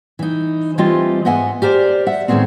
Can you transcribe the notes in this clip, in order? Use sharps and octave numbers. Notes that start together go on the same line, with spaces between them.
E3 D#4
E3 G3 A3 C4 F4 D#5
G#2 B3 D#5 E5 F#5 G#5
G4 A#4 C5 D5
E5 F#5
A2 D#3 E3 G#3 B3 C4